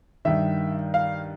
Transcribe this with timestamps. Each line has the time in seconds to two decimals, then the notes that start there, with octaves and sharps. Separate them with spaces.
0.25 G2 D#3 E5
0.94 F5